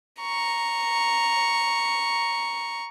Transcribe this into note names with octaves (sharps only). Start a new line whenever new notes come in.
A#5 C#6